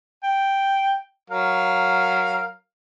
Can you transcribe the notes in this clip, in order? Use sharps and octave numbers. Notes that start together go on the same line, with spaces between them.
G5
F#3 A#4 F5